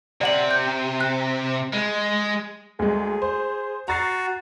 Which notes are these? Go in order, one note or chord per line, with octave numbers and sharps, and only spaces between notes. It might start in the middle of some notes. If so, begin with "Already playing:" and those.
C3 D5 F#5 F#7
G6
F#6
G#3
D2 G#3 G#4
C5
F#4 A#5 A6 C7